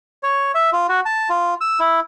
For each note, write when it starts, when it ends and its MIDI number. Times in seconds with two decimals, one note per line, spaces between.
0.23 0.52 73
0.55 0.70 76
0.73 0.87 65
0.89 1.00 66
1.06 1.29 81
1.29 1.54 65
1.61 1.80 88
1.80 2.00 64